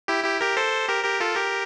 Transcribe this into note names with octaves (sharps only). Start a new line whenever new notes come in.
E4 G4
E4 G4
G4 A#4
A4 C5
G4 A#4
G4 A#4
F4 A4
G4 A#4